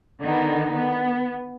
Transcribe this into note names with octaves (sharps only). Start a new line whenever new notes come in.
D3 D#3 B3 D#4
B3